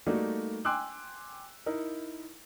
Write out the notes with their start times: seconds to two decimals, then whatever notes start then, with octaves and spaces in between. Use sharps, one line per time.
0.06 G3 A3 A#3 D#4 F#4 D5
0.65 G5 G#5 C6 D6 E6 F#6
1.66 D#4 E4 A#4